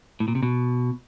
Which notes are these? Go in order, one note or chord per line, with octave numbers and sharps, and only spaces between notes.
A2
A#2
C3
B2